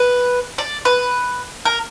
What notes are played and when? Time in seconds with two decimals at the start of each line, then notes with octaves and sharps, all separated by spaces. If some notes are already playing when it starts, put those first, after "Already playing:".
Already playing: B4
0.58 D5
0.85 B4
1.65 A#4